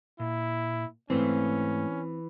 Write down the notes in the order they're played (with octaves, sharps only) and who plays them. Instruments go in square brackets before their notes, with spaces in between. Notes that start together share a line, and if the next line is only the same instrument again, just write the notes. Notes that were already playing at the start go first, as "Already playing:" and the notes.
[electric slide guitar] A#2 [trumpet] E4
[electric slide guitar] G#2 A3 F4 [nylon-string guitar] E3 [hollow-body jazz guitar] C4 [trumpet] C#4